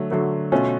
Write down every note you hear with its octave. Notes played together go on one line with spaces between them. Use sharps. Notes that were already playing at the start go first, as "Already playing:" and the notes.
Already playing: D3 F#3 A3
D3 F#3 A3
B2 A3 C#4 F4